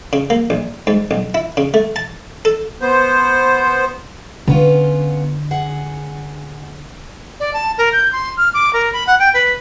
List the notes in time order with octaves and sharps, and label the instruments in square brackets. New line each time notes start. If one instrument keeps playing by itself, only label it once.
[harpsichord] C#3
A#3
A#1
G#2
B1
E4
C#3
A3
A5
A4
[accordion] B3 C5
[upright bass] D3 [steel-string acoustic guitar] B3 C#4 F4
[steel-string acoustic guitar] G#4 F#5
[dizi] D5
A5
A#4
G6
C6
F6
D6
A#4
B5
F#5
G5
B4